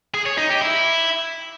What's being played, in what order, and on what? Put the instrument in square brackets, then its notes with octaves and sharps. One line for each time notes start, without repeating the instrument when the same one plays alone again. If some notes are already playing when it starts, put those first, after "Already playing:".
[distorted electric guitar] G#4
C#5
D#4
G4
E4